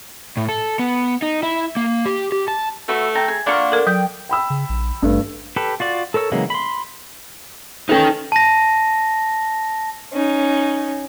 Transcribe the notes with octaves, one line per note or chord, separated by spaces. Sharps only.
A2
A4
B3
D#4
E4
A#3
G4
G4
A5
A3 F#4 B4 E5
A4 G5 A5 A#5
G#4
A#3 D4 F4 F5 F#5 C#6
A4 A#4
F#3 G5
G5 B5 E6
C#3
A#1
G#1 G2 A3
G4 A4 B4
F4 F#4 D5
A4 A#4 C#5 E6
C#3 E3 F#3 G#3 A#3
B5 C6
C#4 D#4 A4 B4 G5
A5 A#6
C#4 D#4